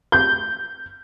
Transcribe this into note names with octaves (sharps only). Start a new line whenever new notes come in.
G6